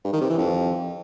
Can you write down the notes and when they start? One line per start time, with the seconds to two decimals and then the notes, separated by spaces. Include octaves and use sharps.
0.04 G2
0.13 D#3
0.21 C3
0.30 E3
0.38 F2